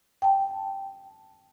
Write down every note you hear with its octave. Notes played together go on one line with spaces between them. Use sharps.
G5 A5